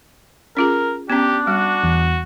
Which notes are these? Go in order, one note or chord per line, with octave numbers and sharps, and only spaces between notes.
C#4 F4 G#4 A#4
B3 C#4 D4 G4
G3 F#4
E2